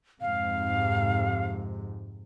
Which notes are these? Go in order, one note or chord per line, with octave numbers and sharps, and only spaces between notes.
F2 G#2 C3 F5